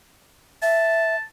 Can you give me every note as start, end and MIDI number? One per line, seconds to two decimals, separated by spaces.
0.62 1.16 76
0.62 1.22 81